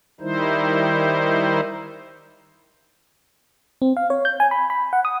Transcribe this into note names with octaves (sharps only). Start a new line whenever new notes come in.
D#3 G3 D#4 E4 C5
C4
F5
C#5
G6
G#5
B5
B5
F#5
D#6